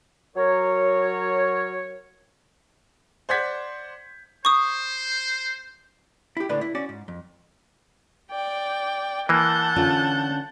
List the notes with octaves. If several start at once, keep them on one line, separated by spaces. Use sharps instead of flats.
F#3 A#4 C#5
C5 D5 F#5 G6 G#6 B6
C5 C#6 D#6
E4 G4
C#2 A2 D3 D4 B4
E4
C#4 F#4 D5
G#2
F2
D5 G5
E3 A#3 F#5 A5 G6
D3 C#4 F4